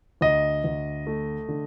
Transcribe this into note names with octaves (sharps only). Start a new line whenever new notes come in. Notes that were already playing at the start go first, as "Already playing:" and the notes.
D2 D#5
D2
A3
D3